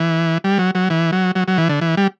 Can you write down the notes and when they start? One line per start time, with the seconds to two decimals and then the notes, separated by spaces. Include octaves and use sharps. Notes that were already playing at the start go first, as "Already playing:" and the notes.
Already playing: E3
0.44 G3
0.59 F#3
0.75 F#3
0.90 E3
1.12 F#3
1.35 F#3
1.48 F#3
1.58 E3
1.69 D3
1.81 E3
1.97 G3